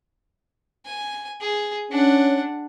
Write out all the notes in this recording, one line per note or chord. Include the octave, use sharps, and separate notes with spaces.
G#5
G#4
C#4 D4 F#5